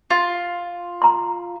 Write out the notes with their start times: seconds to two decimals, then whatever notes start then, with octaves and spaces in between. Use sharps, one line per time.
0.10 F4
1.02 A#5 C6